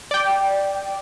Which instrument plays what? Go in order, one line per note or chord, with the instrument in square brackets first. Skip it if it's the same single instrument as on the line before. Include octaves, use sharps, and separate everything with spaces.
[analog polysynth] D5 G5